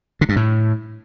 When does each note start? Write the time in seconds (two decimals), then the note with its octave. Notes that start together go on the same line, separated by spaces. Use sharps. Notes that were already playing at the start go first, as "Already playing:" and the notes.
0.21 D3
0.29 G2
0.36 A2